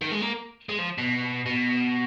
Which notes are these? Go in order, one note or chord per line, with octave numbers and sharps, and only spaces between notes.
D#3
G#3
A#3
G#3
F3
B2
B2